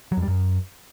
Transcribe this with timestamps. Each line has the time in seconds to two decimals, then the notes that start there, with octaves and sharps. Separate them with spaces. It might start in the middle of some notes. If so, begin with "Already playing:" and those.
0.12 F#3
0.17 F2
0.22 G3
0.28 F#2